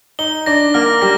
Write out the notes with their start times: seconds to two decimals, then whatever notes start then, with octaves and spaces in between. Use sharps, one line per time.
0.19 D#4 G7
0.46 D4 A#6
0.74 A#3 F6
1.02 G3 A#6